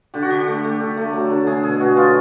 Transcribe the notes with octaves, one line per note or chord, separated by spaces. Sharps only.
D3 G4
F#4
D3 G4
A3
A3
D3
A3
F#3
D3
A3 G#4
B2 G#4
B2 F#4
F#3 F4